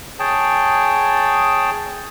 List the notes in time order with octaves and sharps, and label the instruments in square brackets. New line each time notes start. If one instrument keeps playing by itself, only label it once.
[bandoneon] G#4 C#5 G5 A5